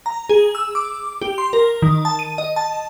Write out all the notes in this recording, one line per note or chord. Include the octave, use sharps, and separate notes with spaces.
A#5
G#4
E6
D6
G4
C6
A#4
D#3
A5
D#7
D#5
A5